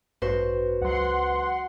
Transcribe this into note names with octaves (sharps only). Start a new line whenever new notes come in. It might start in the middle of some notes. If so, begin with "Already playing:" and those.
A1 G2 F#4 B4 C5
C#2 F#3 F#5 C6